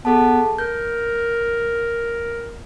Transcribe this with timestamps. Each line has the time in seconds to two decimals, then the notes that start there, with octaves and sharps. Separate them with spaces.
0.05 B3 G#4 A4 A5
0.58 A#4 G6